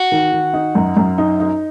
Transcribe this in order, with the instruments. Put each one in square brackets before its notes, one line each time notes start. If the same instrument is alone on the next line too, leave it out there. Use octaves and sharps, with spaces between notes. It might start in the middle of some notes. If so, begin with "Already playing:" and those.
Already playing: [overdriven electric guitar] F#4
[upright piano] D#3
D#3
D#4
F#2
F#2
D#4
D#4